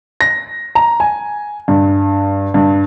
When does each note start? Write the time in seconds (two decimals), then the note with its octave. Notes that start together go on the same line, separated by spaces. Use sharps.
0.21 A#6
0.75 A#5
1.00 G#5
1.68 G2
2.54 G2